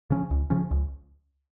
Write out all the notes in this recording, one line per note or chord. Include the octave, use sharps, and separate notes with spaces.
C#3 F3 C#4
C#2
C#3 F3 C#4
C#2